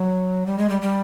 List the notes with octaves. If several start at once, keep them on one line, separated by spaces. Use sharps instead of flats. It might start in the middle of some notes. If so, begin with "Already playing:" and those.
Already playing: F#3
G3
G#3
G3
G3